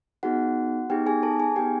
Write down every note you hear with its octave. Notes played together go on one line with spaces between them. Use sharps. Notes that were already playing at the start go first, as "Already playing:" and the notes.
B3 D#4 F#4 G#4 F#5
B3 D#4 G4 G#4 G5
G#4 G#5
A4 A5
G#4 G#5
B3 D#4 G4 G#4 G5